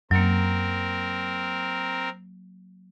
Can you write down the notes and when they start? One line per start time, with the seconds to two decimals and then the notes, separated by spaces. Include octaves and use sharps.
0.11 F#2 F#3 A#3 C4 A#4